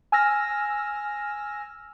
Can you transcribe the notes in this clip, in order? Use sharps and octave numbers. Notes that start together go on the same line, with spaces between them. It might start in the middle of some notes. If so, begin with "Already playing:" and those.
G#5 E6 F6 A#6